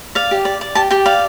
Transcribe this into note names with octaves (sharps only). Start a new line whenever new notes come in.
D5 F5
G4
D5
D5
G4 A5
G4 G5
D5 F5